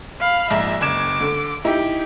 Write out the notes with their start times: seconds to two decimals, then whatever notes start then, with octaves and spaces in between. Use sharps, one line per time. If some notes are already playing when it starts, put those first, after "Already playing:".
0.20 F5 B5
0.51 A#1 G#2 E5
0.81 F#1 D6 G#6 E7
1.20 D3
1.65 D#4 E4 G4